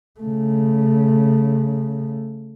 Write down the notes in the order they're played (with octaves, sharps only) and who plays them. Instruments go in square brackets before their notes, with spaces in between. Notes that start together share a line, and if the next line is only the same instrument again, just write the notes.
[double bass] C#3 A3